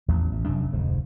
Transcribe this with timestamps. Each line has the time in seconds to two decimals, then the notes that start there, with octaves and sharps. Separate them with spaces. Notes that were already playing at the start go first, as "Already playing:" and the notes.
0.08 A1 E2 F3
0.32 A1
0.46 F1 F#2 C3 D4
0.72 F1 D2 G#2